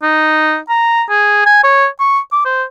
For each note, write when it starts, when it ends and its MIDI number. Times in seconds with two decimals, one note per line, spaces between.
0.02 0.58 63
0.69 1.04 82
1.10 1.43 68
1.46 1.63 80
1.64 1.87 73
2.00 2.19 85
2.32 2.40 86
2.45 2.64 72